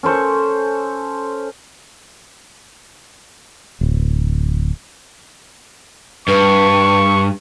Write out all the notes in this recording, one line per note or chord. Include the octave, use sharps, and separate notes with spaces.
C#4 A4 C5 C#6
D1
G2 B4 C#6